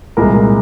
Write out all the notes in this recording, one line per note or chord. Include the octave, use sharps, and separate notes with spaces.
C2 A#2 G#3 A#4